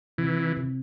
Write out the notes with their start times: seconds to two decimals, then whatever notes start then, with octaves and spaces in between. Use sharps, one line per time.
0.18 C3 E3
0.57 C3